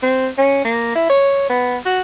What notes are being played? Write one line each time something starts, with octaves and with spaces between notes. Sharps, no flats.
C4
C#4
A#3
E4
C#5
B3
F#4